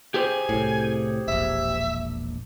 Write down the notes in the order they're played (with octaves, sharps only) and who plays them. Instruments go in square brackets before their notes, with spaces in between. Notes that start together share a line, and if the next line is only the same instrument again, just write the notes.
[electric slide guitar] G4 G#4 C5 [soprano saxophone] G#5
[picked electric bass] C2 A2
[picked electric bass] E1 A#1 [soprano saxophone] E5